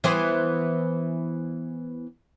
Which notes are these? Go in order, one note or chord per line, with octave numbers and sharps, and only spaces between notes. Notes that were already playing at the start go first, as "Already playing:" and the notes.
E3 B3 C5